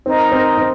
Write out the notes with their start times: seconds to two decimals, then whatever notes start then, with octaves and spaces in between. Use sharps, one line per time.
0.06 C4 D#4 A#4 D#5
0.32 C4
0.58 C4